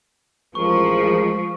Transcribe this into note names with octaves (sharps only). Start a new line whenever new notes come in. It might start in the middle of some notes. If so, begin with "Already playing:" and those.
A1 F3 G#3 A#4 C#6